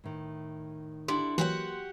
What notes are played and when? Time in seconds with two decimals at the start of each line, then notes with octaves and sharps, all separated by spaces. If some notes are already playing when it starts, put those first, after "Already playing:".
0.04 A2 D#3
1.08 D3 E4 G4 C6
1.38 E3 F#3 A#3 F#4 G4 F#5